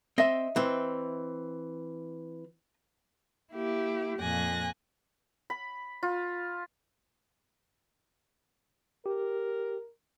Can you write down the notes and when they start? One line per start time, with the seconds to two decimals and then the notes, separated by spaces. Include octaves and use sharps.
0.18 C4 D#5 E5
0.56 E3 C4
3.52 A#3 E4 G4
4.18 F2 A#2 G#5 F#6 A#6
5.50 B5
6.03 F4
9.06 G4 A#4